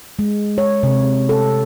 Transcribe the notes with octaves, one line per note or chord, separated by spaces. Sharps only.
G#3
C#5
C3
A4